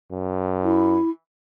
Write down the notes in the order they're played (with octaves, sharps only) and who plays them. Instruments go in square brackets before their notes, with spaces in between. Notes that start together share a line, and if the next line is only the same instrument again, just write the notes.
[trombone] F#2
[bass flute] E4